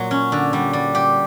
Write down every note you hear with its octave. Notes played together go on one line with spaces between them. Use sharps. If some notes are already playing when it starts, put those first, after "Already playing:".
Already playing: A#2 F#3
C#4
D3
G3
G3
G4